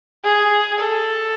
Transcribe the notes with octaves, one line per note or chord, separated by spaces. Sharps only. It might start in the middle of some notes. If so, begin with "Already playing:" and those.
G#4
A4